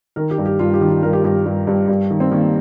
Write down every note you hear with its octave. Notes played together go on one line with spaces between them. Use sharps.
D#3 A#4
G4
G2
G4
G2 F4
G4
D#3
F4
G2 A#4
G4
G2 G4
G2
G2
G2
D#3
C4
D#3 A#3